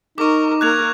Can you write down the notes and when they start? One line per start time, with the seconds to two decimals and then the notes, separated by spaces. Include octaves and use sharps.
0.18 D#4 A#4 C#6 D6
0.61 A#3 A#4 F#6 G#6 F7